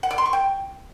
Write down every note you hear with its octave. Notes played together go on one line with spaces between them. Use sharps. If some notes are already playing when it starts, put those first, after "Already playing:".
F#5
D5
C6
C#6
G5